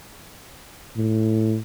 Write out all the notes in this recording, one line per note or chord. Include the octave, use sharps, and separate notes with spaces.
A2